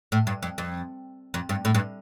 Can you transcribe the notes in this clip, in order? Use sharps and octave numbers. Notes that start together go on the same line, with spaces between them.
A2
G2
F2
F2
F2
G2
A2
G2